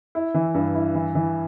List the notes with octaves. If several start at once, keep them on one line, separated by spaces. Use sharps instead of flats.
E4
E3
G2
E4
E3
E3